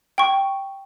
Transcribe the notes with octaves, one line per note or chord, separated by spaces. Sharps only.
G5 C#6